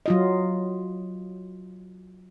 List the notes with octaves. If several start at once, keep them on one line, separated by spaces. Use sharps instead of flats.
F#3 F4 D#5